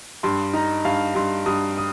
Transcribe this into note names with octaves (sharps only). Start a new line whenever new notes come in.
G2 C6
D#4 A#5
G2 F5
G2 C6
G2 D#6
D#6